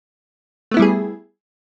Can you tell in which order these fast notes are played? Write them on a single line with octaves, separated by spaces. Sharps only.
A3 B3 E4 G3 G#4